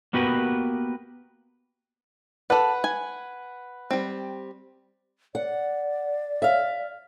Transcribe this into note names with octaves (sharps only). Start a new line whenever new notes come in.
A#3 B3 F#4 G4 A#4 B4
A4 B4 D5 F#5
G#5
G3 C4
D5 F#5
E5 F5